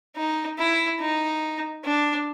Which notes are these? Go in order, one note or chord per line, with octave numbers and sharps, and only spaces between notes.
D#4
E4
D#4
D4